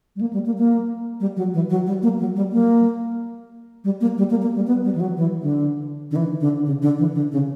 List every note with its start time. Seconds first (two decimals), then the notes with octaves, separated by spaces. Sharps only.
0.16 G3
0.21 A#3
0.33 G3
0.46 A#3
0.58 A#3
1.20 G3
1.36 F#3
1.54 E3
1.70 F#3
1.86 G3
2.03 A#3
2.19 F#3
2.36 G3
2.52 A#3
3.84 G3
4.01 A#3
4.18 G3
4.30 A#3
4.42 A#3
4.55 G3
4.67 B3
4.84 G3
4.95 E3
5.00 F#3
5.17 E3
5.42 D3
6.11 D3
6.16 E3
6.41 D3
6.66 C#3
6.82 D3
6.98 E3
7.15 D3
7.32 C#3